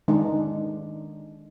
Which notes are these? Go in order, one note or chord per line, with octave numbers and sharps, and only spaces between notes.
D#3 G#3 D4 D#4